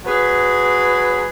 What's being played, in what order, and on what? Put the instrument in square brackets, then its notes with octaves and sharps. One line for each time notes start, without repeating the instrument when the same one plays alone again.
[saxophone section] F#3 G#4 B4